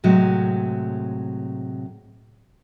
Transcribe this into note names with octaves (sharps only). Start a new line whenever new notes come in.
A2 C3 F#3 G#3